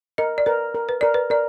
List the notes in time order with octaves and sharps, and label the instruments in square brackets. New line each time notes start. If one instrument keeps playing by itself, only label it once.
[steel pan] A#4 [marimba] D#5
[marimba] D5
[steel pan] A#4 [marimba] B4
[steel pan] A#4
[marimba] B4
[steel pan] A#4 [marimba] D5
[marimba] B4
[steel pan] A#4 [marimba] D5